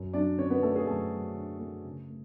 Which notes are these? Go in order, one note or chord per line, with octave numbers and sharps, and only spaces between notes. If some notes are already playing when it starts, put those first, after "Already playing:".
Already playing: F#2
F#3 D4 D5
D3 C#4 C#5
B3 B4
A3 A4
G#4
F#2 A3 A4
F#3
D3
A3
C#3
A3